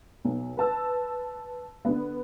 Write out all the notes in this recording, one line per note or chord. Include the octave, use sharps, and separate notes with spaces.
B1
B4 A5 E6
D3 B3